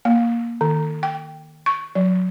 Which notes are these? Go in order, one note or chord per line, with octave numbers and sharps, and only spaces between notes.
A#3
D#3
G5
C#6
F#3